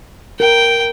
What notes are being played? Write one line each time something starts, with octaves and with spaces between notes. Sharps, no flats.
A#4 G5